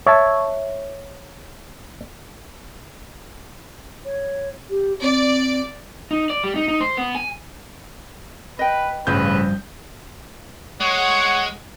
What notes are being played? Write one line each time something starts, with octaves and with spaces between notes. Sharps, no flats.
C#5 E5 A5
C#5
G4
C4 D5
D#4
D5
G3
D#4
D#4
C5
B3
G#5
B4 D#5 G5
A1 G2 C#3 F3 B4 G6
G#3 C#5 F#5